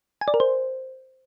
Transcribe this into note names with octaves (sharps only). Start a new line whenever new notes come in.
G#5
D5
A#4
C5